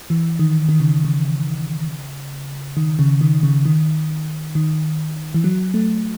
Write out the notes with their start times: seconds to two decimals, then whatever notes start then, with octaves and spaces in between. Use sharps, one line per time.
0.10 E3
0.39 D#3
0.69 D#3
0.80 C#3
1.05 C#3
2.77 D#3
2.99 C#3
3.21 D#3
3.43 C#3
3.66 D#3
4.55 D#3
5.34 E3
5.44 F#3
5.74 A3